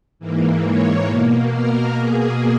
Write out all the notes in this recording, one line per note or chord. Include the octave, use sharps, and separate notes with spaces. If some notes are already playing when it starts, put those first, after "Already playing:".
G#2 E3 A#3
C#5
B2 A#3
A#4
B2 A#3 G#4